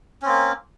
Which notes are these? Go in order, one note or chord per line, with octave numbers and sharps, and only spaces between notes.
A#3 C4 C#4